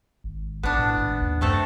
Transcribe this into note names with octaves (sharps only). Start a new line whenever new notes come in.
G#1
A1 B3 D4
A2
G#1
D#2
F#2 C3 A3 A4